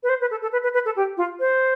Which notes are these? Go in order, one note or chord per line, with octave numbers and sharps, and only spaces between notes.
B4
C5
B4
A4
A4
B4
B4
B4
A4
G4
F4
C5